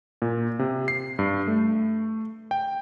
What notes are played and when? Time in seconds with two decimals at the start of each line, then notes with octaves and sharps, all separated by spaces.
0.22 A#2
0.59 C3
0.88 C7
1.19 G2
1.47 A3
2.51 G5